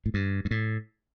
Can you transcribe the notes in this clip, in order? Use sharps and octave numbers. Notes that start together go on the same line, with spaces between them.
A2
G2
G2
A2